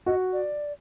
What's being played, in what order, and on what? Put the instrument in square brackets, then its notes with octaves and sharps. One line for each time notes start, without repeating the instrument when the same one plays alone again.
[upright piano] F#4 [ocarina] D#5
[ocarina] D5